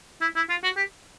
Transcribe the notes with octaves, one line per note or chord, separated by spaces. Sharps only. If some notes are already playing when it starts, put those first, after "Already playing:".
E4
E4
F4
F#4
G4